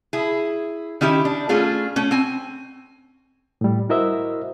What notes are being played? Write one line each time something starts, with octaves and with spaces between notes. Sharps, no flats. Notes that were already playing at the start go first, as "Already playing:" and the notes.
E4 G#4
D#3 C#4 E4 G4 E5
D4
A3 C#4 F4 G#4
A3 C#4
C4 G#5
A2 G3
E4 F#4 A#4 C5 D#5 E5